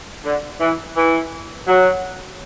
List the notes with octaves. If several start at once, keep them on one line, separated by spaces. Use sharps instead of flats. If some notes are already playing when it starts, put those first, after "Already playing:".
D3
E3
E3
F#3